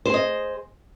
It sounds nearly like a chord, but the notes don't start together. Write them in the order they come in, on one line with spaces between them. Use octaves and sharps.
C5 G#4 D#5